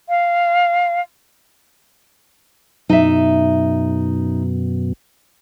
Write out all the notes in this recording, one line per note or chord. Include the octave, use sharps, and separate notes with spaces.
F5
F#2 B2 D#4 E5